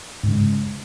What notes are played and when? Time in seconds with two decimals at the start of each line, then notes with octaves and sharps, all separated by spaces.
0.23 G#2
0.27 C#3
0.32 G#3